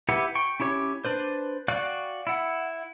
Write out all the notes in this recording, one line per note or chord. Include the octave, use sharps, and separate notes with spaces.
E4 G4 B4 F#5
G5 C#6
C#4 E4 G4 C#5
D4 B4 C5
F#4 D5 F5 G5 F#6
E4 F#5